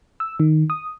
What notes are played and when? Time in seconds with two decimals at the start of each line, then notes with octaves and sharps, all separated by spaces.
0.20 E6
0.40 D#3
0.70 D#6